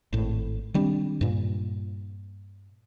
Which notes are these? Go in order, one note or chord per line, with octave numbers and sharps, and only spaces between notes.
G#1 A2
D#3 G3 C4 D4
G2 A#2